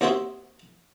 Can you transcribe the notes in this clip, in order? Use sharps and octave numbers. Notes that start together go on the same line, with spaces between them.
D#2 C4 F#4 G#4 E5 C6